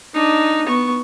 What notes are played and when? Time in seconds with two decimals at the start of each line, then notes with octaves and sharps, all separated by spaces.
0.14 D4 D#4
0.66 B3 C#6